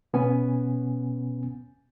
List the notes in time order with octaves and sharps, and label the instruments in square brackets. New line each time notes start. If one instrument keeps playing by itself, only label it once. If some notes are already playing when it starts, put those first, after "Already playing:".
[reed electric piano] B2 B3 C#4 G#5